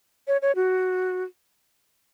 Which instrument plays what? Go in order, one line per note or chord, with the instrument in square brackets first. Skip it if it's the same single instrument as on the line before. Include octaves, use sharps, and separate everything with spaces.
[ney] C#5
C#5
F#4